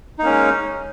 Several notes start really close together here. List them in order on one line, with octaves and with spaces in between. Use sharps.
D#4 A#3 C#4 G#3